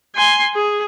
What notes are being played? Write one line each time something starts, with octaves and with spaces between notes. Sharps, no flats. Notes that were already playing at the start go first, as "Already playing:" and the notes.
G#5 C6
G#4